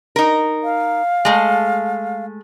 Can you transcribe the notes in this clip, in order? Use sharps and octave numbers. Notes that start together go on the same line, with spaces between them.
D#4 A#4
F5
G#3 A3